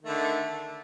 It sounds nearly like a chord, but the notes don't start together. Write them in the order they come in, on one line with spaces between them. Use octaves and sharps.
D#3 A3 D3